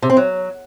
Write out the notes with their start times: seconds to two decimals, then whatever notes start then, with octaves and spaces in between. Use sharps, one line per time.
0.02 C3
0.10 C4
0.17 F#3